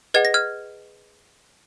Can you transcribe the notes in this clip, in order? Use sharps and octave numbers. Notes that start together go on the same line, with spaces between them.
G#4 B4 D#5 F#5 G#6
A#6
F6 G#6